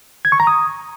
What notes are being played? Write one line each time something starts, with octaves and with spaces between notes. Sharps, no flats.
G#6
C#6
A#5
D#6